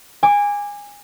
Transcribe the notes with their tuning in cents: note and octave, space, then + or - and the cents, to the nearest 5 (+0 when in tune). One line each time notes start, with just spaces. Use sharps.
G#5 -20 D6 +0